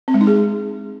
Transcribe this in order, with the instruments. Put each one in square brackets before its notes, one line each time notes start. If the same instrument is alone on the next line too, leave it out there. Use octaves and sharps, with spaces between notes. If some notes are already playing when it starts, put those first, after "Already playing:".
[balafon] C4
G#3
D#4
G#4